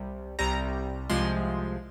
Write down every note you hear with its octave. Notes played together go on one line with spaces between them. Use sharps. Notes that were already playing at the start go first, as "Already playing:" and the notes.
Already playing: C2 C3 G3
C2 C3 G3 A#5
C2 C3 F3 G#3 C6